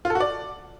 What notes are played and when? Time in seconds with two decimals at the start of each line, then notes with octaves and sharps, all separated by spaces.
0.05 F4
0.10 A4
0.15 F#4
0.20 D5